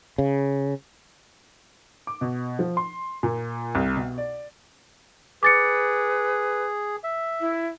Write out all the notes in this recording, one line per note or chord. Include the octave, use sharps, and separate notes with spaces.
C#3
D6
B2
F3
C6
A#2
C2
B2
D5
G#4 B4 D6 A6 C#7
E5
E4